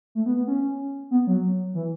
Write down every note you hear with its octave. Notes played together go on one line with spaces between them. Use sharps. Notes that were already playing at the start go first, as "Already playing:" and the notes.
A3
B3
B3
C#4
B3
F#3
E3